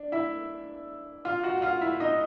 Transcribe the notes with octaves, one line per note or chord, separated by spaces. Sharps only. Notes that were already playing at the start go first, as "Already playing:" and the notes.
Already playing: D4
E4 E5
F4 F5
F#4 F#5
F#5
F4 F5
E4 E5
D#4 D#5